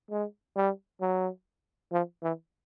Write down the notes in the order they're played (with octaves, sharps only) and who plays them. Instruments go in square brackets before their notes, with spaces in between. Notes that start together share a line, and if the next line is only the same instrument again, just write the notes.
[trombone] G#3
G3
F#3
F3
E3